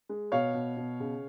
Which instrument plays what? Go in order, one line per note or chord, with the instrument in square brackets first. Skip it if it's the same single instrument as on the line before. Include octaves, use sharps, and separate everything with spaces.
[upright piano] G#3
B2 C#5 F5
B2
B2
C#3